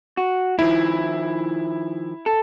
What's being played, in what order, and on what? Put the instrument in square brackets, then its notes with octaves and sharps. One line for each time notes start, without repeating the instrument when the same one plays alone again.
[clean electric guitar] F#4
[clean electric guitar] D#3 F3 [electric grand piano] E4
[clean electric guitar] A4